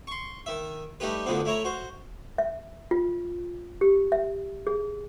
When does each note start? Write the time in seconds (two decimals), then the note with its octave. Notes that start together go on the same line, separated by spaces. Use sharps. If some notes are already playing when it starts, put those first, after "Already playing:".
0.07 C6 C#6
0.46 D#3 E5
1.00 G3 A3 D#4 G4 B4
1.26 D2 D3 D#3 F3 B3 C4
1.45 A3 E4 C#5 A#5
1.64 F#4 C5
2.38 E5
2.91 F4
3.81 G4
4.12 E5
4.67 G#4